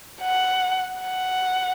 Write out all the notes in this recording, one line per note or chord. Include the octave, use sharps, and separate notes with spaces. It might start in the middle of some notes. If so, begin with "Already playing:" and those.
F#5
F#5